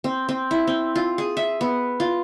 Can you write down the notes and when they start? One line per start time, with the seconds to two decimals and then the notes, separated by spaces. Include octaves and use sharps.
0.04 C4
0.29 C4
0.51 E4
0.67 C4
0.96 F4
1.18 G#4
1.37 E5
1.61 B3
2.00 F4